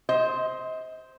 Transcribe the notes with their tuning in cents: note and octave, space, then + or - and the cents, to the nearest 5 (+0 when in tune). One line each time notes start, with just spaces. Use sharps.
C5 +0 D#5 +40